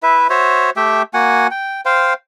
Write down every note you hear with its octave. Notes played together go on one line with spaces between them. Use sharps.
E4 B4 E5
F#4 C5 C#5 E5
A3 G4 E5 G5
A#3 F#4 F#5 G#5
G5
C5 F5 G5